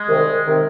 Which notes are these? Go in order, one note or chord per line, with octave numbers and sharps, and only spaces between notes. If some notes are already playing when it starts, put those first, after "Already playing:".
Already playing: G#3
C2 C3 D#3
C3 D#3